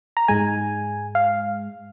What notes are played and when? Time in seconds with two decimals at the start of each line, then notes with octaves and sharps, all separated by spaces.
0.17 A#5
0.28 G#2 G#3 G#5
1.15 F5